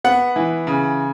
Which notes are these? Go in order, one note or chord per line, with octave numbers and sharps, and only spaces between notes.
B3 F#5
E3
C#3